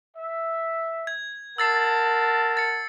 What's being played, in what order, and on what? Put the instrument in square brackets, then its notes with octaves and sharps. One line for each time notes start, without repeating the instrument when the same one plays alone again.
[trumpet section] E5
[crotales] G#6
[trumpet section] A#4 F#5 A5 [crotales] E6 A6 C7
[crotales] A6 C#7